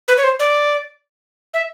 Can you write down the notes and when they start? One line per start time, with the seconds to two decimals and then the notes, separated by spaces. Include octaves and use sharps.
0.08 B4
0.17 C#5
0.24 C5
0.39 D5
1.54 E5